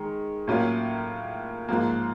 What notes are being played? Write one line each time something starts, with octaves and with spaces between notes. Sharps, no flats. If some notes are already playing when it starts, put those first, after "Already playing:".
Already playing: D#3 G#3
A2 F#3 A#3 C#4 F4
G#2 F3 A#3